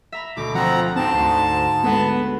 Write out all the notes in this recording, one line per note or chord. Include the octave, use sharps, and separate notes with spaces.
E5 A#5 B5
D2 B2 D6
F3 C4 F#4 F#5 A#5
G#2 C4 A5
D2 F#4 C5
D2 G#3 B3